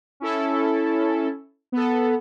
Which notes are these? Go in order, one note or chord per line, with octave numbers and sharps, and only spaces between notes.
C#4 E4 A4
B3 A4